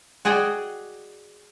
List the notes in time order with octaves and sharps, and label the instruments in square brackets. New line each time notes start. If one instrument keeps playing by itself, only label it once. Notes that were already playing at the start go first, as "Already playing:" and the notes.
[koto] F#4 G#4 D5 D#5 G5